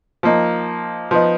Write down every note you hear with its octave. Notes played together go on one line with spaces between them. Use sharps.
F3 A#3 D#4
F3 B3 D#4